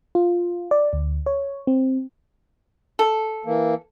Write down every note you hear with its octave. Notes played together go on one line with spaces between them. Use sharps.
F4
D5
D2
C#5
C4
A4
E3 A#3